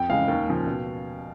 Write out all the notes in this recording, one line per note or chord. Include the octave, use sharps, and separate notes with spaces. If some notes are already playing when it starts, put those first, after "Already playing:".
Already playing: F2 G5
C#3 E3 G#3 F5
D#2
C#3 F3
B2